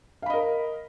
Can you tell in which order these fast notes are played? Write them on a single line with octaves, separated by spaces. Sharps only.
F5 B5 D#5 A#4